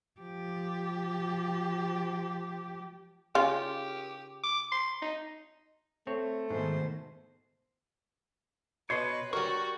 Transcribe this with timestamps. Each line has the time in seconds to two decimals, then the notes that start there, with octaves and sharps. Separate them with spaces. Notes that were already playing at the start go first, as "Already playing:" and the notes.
0.21 F3 G4
3.35 C#3 F4 G4
4.44 D6
4.72 C6
5.02 D#4
6.07 A3 C4 C#5
6.51 G#2 B2 D#3 C5
8.90 B2 B4 C#5 D#5 C6
9.33 G3 F#4 A#4 C#6